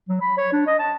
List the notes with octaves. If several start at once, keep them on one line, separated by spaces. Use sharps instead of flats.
F#3
B5
C#5
D4
D#5
A5